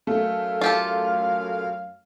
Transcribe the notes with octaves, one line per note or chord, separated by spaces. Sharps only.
F#2 A3 F5
F4 G4 A4